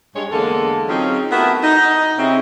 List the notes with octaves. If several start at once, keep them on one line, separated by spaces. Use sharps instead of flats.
G2 G#3 C#5
E2 D3 G#3 A#3 A4
F#3 C4 C#4 D#4 F4 G#4
A3 B3 E4 F#4 A4 A#4
D#4 D#5
C3 C4 C#4 E4 F4 G#4